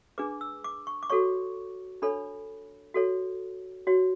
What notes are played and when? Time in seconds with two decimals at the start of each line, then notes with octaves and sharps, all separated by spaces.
0.18 D4 G#4 B4 D6
0.41 E6
0.64 D6
0.87 C#6
1.03 D6
1.10 F#4 A4 C#5 C#6
2.02 D4 A4 C#5 B5
2.94 F#4 A4 C#5
3.87 F#4 C#5